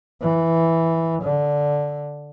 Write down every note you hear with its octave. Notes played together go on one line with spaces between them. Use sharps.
E3
D3